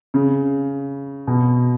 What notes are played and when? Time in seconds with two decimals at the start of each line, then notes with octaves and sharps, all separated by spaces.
0.14 C#3
1.27 B2